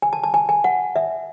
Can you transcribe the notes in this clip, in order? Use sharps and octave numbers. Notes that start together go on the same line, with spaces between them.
G#5
A5
A5
G#5
G#5
F#5
E5